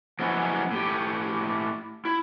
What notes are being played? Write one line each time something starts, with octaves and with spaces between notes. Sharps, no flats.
F3 F#3 G#3 B3 C#4 E4
A2 G4
E4